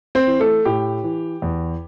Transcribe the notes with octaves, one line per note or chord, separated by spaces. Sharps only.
C4 C5
E3
A3 A4
A2 G4
E3
E2